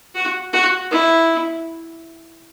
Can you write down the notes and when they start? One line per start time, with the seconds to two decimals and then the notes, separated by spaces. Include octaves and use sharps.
0.15 F#4
0.53 F#4
0.91 E4